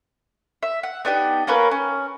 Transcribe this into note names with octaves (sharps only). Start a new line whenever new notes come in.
E5
F#5
B3 D4 D#4 G4
A#3 C#4 A#4 B4
C#4